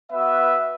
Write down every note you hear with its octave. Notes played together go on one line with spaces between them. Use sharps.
B3 F#4 B4 E5